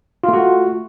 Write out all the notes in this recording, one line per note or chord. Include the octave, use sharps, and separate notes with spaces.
A3 F4 F#4